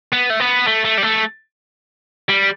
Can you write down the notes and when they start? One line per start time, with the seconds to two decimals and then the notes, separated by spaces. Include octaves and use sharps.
0.12 B3
0.30 A3
0.40 B3
0.67 A3
0.85 A3
0.98 G3
1.03 A3
2.29 G3